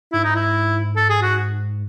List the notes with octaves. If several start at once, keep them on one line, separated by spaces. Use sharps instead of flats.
G#2 E4
D#4
E4
A4
G#4
F#4